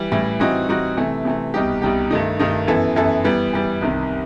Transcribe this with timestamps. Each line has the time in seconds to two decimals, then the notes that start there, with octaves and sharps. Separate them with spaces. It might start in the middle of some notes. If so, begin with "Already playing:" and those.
Already playing: E3 G3
0.12 A2 E3 G3
0.40 E3 G3 C4 D#4 F#4
0.69 E3 G3 C4 D#4 F#4
0.97 C3 E3 A3
1.25 C3 E3 A3
1.54 C2 B2 G3 D#4 G4
1.82 C2 B2 G3 D#4 G4
2.11 G2 D#3 A3 D#4
2.40 G2 D#3 A3 D#4
2.67 F#2 E3 B3 E4 A4
2.96 F#2 E3 B3 E4 A4
3.24 E3 G3 B3
3.53 E3 G3 B3
3.81 C2 C3 D#3